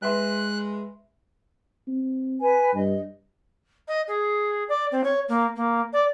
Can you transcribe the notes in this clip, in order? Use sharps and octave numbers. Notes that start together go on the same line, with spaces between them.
G#3 B4 E5 C6 F#6
C4
B4 G#5
G2 D#5
D#5
G#4
D5
C4
C#5
A#3
A#3
D5